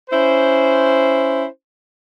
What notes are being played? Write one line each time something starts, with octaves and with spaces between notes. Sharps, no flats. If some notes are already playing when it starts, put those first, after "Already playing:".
C#4 E4 C5